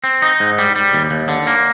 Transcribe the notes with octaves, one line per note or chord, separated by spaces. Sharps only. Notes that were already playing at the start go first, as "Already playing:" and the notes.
C4
D#4
G#2
G3
G3
D#2
D#2
D3
A#3